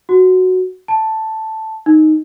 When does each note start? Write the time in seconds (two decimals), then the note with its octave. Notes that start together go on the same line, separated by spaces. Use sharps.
0.09 F#4
0.88 A5
1.86 D#4